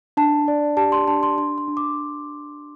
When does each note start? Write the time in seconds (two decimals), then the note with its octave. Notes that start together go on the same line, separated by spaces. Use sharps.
0.17 D4 A5
0.48 D5
0.77 G4 A5
0.92 C6
1.08 D4 A5
1.23 C6
1.38 D4 C6
1.58 C6
1.68 D4
1.77 D6